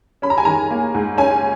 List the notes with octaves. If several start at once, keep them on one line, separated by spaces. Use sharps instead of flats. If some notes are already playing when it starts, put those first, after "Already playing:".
C#4 B5
A#5
G#5
D#3 A#5
A#3
G#2
C#4 G#5